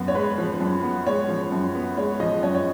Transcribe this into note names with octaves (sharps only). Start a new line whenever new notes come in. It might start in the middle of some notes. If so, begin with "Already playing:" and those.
Already playing: F#2 B3
C#5
G#3 B4
F3
F#2
B3
G#3 C#5
F3
F#2
B3
G#3 C#5
F3 D#5
F#2 C#5
C#5